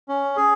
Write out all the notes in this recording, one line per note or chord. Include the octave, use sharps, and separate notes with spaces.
C#4
G#4